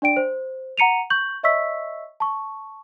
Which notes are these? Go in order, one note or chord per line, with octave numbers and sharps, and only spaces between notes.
D4 D5 G5 D7
C5
F#5 A#5 C#7 D#7 F7
C#6 G6 F#7
C#5 D#5 E5 C#6 E6 B6
A5 C#6